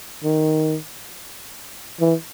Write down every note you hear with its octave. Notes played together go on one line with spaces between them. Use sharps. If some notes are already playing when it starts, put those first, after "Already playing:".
D#3
E3